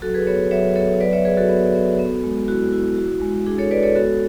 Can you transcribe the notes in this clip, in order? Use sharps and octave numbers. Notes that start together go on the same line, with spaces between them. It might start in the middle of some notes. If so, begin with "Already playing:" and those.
F#3 F#4 A4
G#4 B4
B3 A4 C#5
F#3 C#5 E5
B3 A4 C#5
F#3 B4 D5
C#5 E5
F#3 G#4 B4
F#4 A4
B3
B3
B3
G#3
E4 F#4
E4
F#4
G#3
D4 G#4
A4 C#5
G#3 B4 D5
A4 C#5
B3 F#4 A4